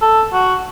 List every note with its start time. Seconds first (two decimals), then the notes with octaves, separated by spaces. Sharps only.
0.01 A4
0.33 F#4